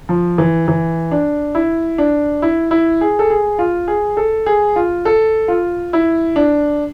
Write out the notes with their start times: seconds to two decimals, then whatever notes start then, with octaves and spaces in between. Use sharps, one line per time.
0.09 F3
0.38 E3
0.68 E3
1.11 D4
1.55 E4
1.98 D4
2.42 E4
2.71 E4
3.01 G#4
3.19 A4
3.30 G#4
3.59 F4
3.88 G#4
4.17 A4
4.46 G#4
4.76 F4
5.05 A4
5.48 F4
5.93 E4
6.36 D4